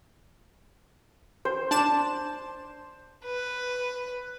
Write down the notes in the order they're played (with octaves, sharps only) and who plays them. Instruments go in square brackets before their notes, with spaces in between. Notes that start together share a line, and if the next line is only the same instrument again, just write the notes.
[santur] C5
[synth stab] D4 A5 E7
[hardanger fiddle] B4